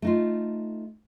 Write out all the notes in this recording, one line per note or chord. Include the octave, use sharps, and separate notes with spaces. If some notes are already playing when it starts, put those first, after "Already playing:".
A3 D#4 F4